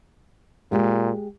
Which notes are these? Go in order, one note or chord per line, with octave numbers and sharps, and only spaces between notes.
A#2 G#3 G4